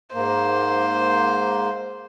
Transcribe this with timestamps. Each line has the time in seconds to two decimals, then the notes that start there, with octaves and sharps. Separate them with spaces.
0.14 G#2 A#3 C5